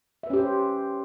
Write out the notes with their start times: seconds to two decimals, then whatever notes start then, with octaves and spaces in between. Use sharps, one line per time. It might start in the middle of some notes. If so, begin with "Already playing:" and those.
0.23 E5
0.27 B4
0.30 C#4
0.34 G4
0.37 C5